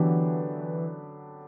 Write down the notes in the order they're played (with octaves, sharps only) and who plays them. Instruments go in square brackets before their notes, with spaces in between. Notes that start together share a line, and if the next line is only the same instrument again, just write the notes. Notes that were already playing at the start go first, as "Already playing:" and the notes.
Already playing: [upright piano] D3 F#3 B3 D4 G4 [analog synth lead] E3